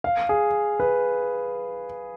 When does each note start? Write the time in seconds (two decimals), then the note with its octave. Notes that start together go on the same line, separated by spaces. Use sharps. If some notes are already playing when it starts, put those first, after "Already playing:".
0.04 F5
0.29 G#4
0.80 B4